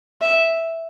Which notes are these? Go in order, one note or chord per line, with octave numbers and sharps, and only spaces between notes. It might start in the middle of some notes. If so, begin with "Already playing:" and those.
E5